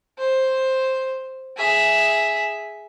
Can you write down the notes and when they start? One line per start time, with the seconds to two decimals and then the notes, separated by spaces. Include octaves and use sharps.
0.19 C5
1.57 G#4 E5